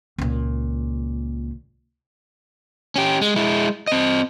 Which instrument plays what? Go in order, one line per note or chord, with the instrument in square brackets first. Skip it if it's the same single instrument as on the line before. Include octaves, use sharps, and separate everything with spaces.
[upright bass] C#2 A#2
[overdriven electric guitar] C#4 G4
G#3
G#3 E4
C4 D#5